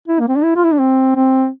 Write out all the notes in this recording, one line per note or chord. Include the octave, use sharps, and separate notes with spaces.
E4
A#3
C4
D4
E4
F4
E4
D4
C4
C4